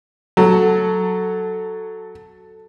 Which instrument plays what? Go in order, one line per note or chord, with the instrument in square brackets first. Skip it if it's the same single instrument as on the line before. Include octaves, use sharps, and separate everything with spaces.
[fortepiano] F#3 [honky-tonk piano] A4